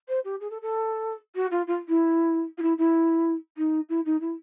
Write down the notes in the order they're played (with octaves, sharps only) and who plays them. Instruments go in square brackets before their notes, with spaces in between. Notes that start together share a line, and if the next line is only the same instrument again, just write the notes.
[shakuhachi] C5
G4
G#4
A4
A4
F#4
F4
F4
E4
F4
E4
E4
D#4
E4
D#4
E4